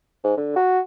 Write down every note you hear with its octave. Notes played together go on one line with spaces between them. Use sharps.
G#2
D3
F#4